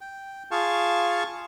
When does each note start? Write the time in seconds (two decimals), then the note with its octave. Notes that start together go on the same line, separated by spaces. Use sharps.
0.01 G5
0.51 F4 G#4 F5 A5 C#6